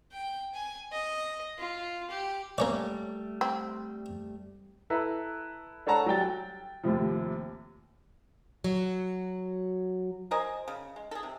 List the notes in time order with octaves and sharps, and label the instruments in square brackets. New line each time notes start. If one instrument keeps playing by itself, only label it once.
[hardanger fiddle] G5
G#5
D#5
F4
G4
[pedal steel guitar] G3 A3 [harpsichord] A#3 C#4 D5
[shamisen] C4
[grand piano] E4 A4 B4 A#5
D4 A4 C#5 F#5 A5 A#5
F#3 G3 G5 A6
G5
D#2 A2 C3 F3
[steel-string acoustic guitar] F#3 F#4
[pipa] A#4 C5 D#5 G#5
C#3
G#3
G#4 A4
C3